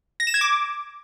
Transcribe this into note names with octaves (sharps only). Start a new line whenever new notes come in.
A#6
E7
G#6
D6